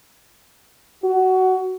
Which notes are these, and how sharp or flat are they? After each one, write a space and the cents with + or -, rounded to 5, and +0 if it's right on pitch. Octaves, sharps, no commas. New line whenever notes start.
F#4 +15